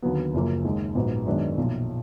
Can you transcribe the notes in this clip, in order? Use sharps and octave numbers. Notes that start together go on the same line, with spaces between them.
D#2 D3 F#3 B3
F#1 F#2 F3 A#3
D#2 D#3 G#3
A#1 G#2 F#3 B3
F#2 D#3 G#3 B3 D4
B1 A#2 F3